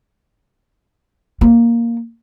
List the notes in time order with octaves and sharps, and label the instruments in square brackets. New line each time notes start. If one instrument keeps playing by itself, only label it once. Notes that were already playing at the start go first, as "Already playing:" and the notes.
[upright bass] A#3